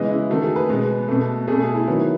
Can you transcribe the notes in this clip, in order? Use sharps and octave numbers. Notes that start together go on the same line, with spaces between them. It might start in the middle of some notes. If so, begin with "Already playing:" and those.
Already playing: C#3 E3 G#3 B3 D#5
E4
D#3 A3 F#4
G#4
B4
B2 G#3 B3
B2 A3
B2 A3 G#4
G#4
E4
D#3 F#3 B3 E4